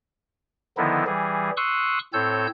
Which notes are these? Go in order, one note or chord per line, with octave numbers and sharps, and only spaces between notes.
D3 D#3 F3 B3 D#4 E4
E3 G3 G#4
C6 C#6 D#6 E6 F#6
A2 C4 A4 C#5 E6 G6